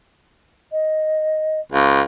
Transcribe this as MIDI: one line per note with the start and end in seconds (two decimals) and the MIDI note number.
0.71 1.59 75
1.72 2.01 37
1.72 2.02 77